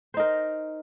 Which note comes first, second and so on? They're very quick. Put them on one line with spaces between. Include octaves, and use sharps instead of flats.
C5 D#4 A#4